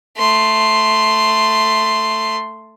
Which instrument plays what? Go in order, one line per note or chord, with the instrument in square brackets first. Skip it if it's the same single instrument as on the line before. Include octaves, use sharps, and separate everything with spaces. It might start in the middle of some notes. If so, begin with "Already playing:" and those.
[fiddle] A3 C6